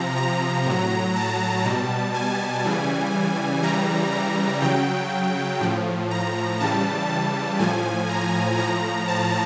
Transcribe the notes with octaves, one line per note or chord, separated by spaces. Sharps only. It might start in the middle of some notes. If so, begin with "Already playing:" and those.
Already playing: C3 F3 A#5
A#5
A2 F#3
A5
B2 G3
G#5
C#3 E3 G3
C#3 E3 G3 A#5
A#5
C#3 F#3 G5
A2 F3
A#5
C#3 E3 G3 A5
A5
A2 F3 G#5
A#5
A2 F3 A#5
A5